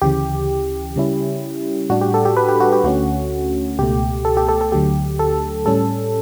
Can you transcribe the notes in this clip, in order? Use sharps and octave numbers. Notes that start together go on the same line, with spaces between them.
D2 C#3 E3 G4
C#3 G3 C#4 E4
A2 G3 D4 F#4
G4
A4
G4
B4
G4
F#4
G4
D2 D3 A3 C#4 F#4
C#2 B2 A3 G4
A4
G4
A4
A4
D2 D3 F#3 A3 G4
A4
A2 G3 C#4 A4